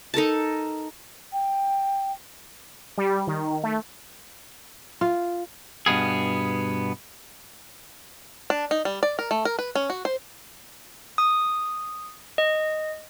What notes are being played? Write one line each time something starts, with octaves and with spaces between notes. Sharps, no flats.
D#4 A4 A#4 A5
G5
G3
D#3
A3
F4
G2 B2 B3 G#4
D4
D#4
G3
D5
A#4
A3
A#4
B4
C#4
F#4
C5
D#6
D#5